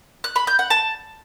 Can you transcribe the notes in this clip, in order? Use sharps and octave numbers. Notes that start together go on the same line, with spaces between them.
F#6
B5
G6
F#5
A5